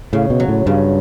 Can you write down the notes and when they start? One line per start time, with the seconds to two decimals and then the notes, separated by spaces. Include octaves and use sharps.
0.13 A2 C#3
0.30 B2
0.40 F#3
0.48 A2
0.66 G2 C#3